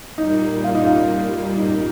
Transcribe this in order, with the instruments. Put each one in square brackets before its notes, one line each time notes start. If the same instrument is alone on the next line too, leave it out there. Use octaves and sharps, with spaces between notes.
[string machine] A#2 G3 A#3 [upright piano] D#4
[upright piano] F4
D#4
F4
D#4